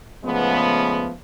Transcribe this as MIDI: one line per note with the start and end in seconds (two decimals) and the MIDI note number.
0.24 1.12 49
0.24 1.12 53
0.24 1.12 56
0.24 1.12 57
0.24 1.12 59